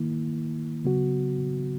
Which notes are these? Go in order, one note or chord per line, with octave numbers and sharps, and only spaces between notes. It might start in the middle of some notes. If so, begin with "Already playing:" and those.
Already playing: D#3 A#3 E4
C#3 F#3 B3 F#4